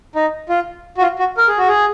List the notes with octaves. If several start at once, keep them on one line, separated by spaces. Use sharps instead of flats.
D#4
F4
F#4
F4
F#4
A#4
G#4
F#4
G#4